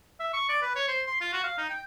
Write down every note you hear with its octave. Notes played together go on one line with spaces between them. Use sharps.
E5
C#6
D5
B4
C#5
C5
C6
F4
F#4
F5
D#4
G5